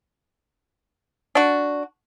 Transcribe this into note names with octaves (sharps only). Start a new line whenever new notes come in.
D4 F#4